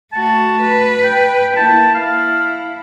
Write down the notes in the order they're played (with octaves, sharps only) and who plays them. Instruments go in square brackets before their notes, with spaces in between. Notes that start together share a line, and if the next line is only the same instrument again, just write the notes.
[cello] A3 F#4 [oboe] A5
[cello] B4
[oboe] G5
[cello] A#3 E4 [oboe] A5
[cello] E4 [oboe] F5